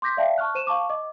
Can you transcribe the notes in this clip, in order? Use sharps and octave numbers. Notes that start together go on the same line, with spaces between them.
C6 D6 G6 A#6 B6
D5 E5 F5 G5 A5
A5 C#6 F6 F#6
C5 D#7 E7
F5 A5 C#6 D6
D#5 D6